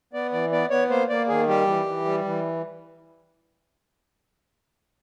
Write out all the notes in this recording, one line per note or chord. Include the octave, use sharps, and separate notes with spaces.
B3 D5
E3 D5
B3 D5
B3 C#5
A#3 C5
A#3 D5
D#3 G#4
G3 G4
E3
E3
G3
E3